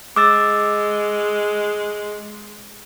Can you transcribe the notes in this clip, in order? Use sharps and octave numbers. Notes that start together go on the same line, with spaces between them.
G#3 D6 E6 A6